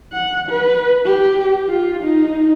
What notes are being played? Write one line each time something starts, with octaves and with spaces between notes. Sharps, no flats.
F#5
B4
G4
F4
D#4